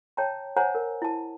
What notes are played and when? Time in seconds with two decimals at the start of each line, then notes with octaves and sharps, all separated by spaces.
0.17 C#5 G5 A5 A#5
0.56 C5 C#5 F#5 G#5 A#5
0.75 A#4
1.02 E4 A5